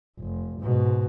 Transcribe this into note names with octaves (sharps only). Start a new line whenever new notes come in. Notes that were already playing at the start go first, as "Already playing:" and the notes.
F1
G#2 B2